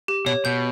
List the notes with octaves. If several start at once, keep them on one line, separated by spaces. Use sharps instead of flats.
G4
B2 C#5
B2 G6